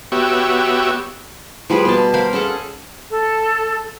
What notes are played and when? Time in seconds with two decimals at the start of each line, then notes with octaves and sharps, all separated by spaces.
0.12 B3 F#4 G4 C#5 E5
1.70 F3 G3 G#4 B4
1.85 B2 A5
2.14 A#4 C5 F5 B5
2.33 C#4 G#4 A4 F#5
3.10 A4